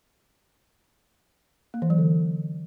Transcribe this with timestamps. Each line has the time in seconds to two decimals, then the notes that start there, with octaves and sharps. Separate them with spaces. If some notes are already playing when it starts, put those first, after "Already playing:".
1.74 A#3
1.82 E3
1.90 F#3
1.98 D3